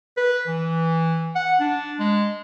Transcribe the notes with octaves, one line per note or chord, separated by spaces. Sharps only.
B4
E3
F#5
D4
G#3